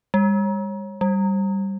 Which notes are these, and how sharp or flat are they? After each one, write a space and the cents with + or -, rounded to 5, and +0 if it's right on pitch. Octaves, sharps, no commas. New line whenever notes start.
G3 +45
G3 -5